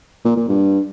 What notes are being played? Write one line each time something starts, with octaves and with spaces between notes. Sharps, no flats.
A#2
A#2
G2